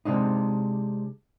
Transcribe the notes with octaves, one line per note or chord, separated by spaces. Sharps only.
C3 G#3 D4 D#4